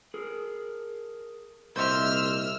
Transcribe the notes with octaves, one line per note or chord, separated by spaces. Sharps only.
G#4 A#4
C2 A#2 C5 D#5 E5 E6 F6